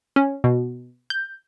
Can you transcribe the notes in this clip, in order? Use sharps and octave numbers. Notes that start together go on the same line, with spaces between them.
C#4
B2
G6